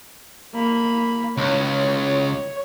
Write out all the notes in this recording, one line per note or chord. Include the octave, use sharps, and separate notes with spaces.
A#3 B5
C#2 C#5